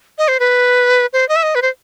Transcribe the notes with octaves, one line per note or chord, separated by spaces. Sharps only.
D#5
C5
B4
C5
D#5
E5
D#5
B4
C5